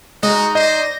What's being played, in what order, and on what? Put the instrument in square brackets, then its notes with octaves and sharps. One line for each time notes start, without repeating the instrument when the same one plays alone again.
[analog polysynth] G#3 [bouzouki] D#4 [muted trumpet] F#4
[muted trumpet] C5 [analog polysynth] D5 A#6 [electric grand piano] D#5